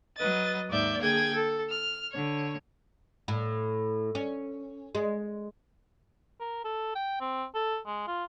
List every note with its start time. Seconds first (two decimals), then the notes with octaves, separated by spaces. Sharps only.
0.17 F#3 B4 D#5 A6
0.70 D#2 G#2 D5 E5 G6
1.02 D3 A#3 G#4 G5 G#6
1.35 A4
1.69 F6
2.11 D3 C#5
3.28 A2
4.15 C#4
4.95 G#3
6.40 A#4
6.65 A4
6.96 G5
7.21 C4
7.55 A4
7.87 G#3
8.07 F4